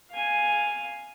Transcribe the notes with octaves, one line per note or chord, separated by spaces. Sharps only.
F5 G#5